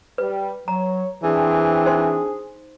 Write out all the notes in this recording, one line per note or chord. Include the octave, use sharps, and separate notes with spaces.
G3 B4
F#3 C#5 A#5
E3 C4 D4 G#4
D#4 C5 C6